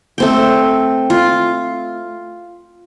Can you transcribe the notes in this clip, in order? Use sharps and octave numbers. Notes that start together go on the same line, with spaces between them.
A3 C4 G5
F4